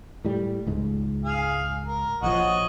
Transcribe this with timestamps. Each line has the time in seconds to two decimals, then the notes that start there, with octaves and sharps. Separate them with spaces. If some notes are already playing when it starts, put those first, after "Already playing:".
0.25 A2 G3
0.67 C#2 G#2
1.25 G#4 F5
1.85 A#4
2.22 A#1 F3 F#4 C#5 D#5